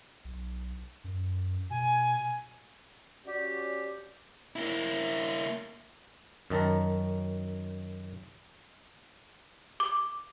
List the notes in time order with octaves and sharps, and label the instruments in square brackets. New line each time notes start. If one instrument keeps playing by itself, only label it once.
[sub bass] B1
F#2
[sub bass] B2 [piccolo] G#5
[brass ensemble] C#4 F#4 D5 [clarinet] G4
[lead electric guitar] A#3 E4
[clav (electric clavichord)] F#2 D#3 A5 A#5
[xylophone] D6